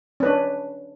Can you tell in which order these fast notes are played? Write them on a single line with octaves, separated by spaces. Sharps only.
C#4 B4 D4